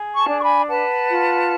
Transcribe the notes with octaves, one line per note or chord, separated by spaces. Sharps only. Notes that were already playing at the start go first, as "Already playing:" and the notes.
Already playing: G#4
A5 C#6
D4
C#6
G#5 B5
B4 F#5 A5
F4